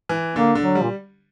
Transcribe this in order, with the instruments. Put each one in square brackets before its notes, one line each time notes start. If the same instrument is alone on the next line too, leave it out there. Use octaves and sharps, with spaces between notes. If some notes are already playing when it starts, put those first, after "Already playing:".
[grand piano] E3
[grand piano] D3 [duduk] A#3
[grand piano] D3
[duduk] F#3
[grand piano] G3
[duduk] A#2